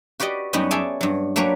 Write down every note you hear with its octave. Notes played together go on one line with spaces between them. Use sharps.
F#4 G4 B4 D5 D#5
F#2 G3 B3 D#4 F#4 D#5
G#4 C#5 D5 E5 G5 A5
G2 F#3
F#3 A#3 D4 G4 B4 C#5